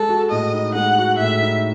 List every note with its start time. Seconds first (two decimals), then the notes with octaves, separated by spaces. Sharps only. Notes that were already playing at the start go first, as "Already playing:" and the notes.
Already playing: G#3 A4
0.09 F#4
0.31 A2 D#5
0.53 D#4
0.75 G#3 F#5
0.98 F#4
1.19 A2 E5
1.42 D#4